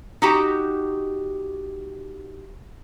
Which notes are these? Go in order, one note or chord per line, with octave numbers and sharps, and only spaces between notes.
D#4 F#4 G4